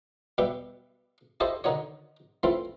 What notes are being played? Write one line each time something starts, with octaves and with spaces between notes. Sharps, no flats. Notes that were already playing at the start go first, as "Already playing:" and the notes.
B2 G3 G4 B4 E5
E4 G4 A4 C5 D#5 E5
D3 D#3 D#4 F#4 C#5
E3 A3 C4 E4 F4 A4